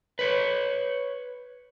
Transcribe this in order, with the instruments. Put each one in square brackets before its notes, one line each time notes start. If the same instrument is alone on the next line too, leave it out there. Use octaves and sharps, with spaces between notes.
[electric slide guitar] B4 C#5